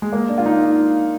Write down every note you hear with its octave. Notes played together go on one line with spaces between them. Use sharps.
G#3
A#3
D4
F4
D#4